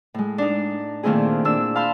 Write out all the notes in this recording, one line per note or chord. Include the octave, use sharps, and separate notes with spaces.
A2 G#3
D4 D#4
A#2 D#3 A3 C4 E4 G#4
A#2 D4 E6
F5 A5 B5 C6 G6